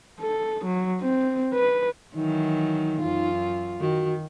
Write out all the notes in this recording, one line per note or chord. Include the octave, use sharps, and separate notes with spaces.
A4
F#3
C4
B4
D#3 E3 F#3 D#4
F#2 F4
D#3 F#4